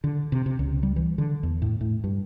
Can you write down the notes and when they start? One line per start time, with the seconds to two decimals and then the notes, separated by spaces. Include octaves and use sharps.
0.04 D3
0.32 C3
0.46 C3
0.59 C#2
0.83 G3
0.96 E3
1.18 D3
1.43 E2
1.62 A2
1.81 A2
2.04 G2